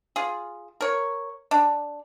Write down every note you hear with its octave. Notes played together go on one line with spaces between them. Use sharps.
F4 G#4
A#4 C#5
D4